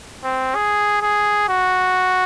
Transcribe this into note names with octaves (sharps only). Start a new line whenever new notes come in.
C4
G#4
G#4
F#4